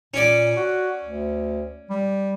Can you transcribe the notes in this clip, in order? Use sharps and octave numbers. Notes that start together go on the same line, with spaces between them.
A#2 C#4 D5
F#4
D2
G3